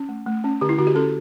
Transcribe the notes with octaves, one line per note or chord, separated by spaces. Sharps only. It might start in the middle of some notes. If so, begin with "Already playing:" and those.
Already playing: C#4
A3
A3
C#4
D3 G4
E4
D3 F#4
G4
C#4 A4